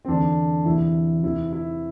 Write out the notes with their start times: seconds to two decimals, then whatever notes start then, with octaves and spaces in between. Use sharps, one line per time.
0.05 C4
0.08 E2 D3 D4
0.65 E2 C3 E3 E4
1.23 E2 C3 E3 E4
1.53 E4